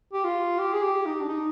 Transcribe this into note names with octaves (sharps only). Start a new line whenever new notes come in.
G4
F4
G4
G#4
G4
D#4
D4
D#4